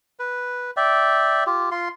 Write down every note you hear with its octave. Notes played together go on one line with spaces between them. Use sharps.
B4
D5 E5 G5
F4 G4
F4 C6